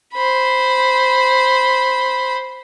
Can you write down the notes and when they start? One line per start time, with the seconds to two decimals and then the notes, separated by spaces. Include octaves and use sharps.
0.14 C5 B5